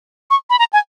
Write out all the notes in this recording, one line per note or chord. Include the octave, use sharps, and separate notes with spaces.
C#6
B5
A#5
G#5